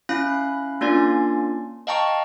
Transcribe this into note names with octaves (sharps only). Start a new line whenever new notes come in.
C#4 E4 F5 B5 F#6
A#3 C#4 D4 F4 D5 G#5
D#5 F5 G5 A5 A#5 C#6